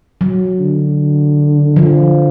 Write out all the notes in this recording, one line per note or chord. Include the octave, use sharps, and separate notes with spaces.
F#3
D3
F3